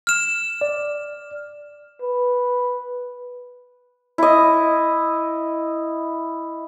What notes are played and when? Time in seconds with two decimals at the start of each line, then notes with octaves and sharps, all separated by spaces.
0.07 F6 E7
0.61 D5
2.02 B4
4.18 E4 D#5